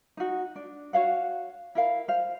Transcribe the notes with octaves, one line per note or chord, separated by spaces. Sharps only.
D#4 F#4
D4
F#4 C#5 F5 F#5
E4 A#4 F5
C5 F5